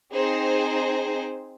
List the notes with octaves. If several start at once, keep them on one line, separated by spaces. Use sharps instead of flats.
C4 D#4 G#4 C5